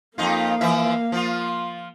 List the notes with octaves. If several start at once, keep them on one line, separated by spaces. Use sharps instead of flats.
F2 A#3 D#4 F4 F5
E3 F3 E5
F3 F4